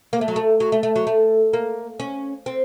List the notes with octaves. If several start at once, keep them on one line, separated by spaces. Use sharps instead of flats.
A#3
A3
F#3
A3
F#3
A3
A3
F#3
A3
A#3
C#4
C4